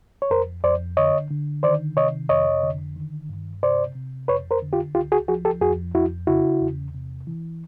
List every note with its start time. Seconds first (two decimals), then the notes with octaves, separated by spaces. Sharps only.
0.22 C#5
0.30 F2 A#4 C5
0.64 F2 C5 D5
0.97 D3 C#5 D#5
1.31 D3
1.63 D#3 C5 D5
1.97 C3 C#5 D#5
2.29 F2 C#5 D#5
2.63 D3
2.96 D#3
3.29 G2
3.63 C3 C5 D5
3.95 C3
4.28 F2 B4 C#5
4.51 A#4 C5
4.62 D3
4.73 F4 G4
4.95 C#2 F4 G4
5.12 F#4 G#4
5.28 F3 F#4 G#4
5.45 G4 A4
5.61 F2 F#4 G#4
5.94 F2 E4 F#4
6.27 C#3 E4 F#4
6.61 E2
6.94 C3
7.27 E3